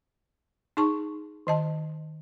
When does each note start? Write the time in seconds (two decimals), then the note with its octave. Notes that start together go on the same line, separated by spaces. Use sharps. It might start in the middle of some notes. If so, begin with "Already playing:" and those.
0.77 D#4 G#4 A5 C#6
1.47 D#3 D#5 A5